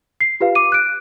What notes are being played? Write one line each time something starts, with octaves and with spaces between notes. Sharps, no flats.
C7
F4 G4 B4 F5
D6 D#7
F#6 D7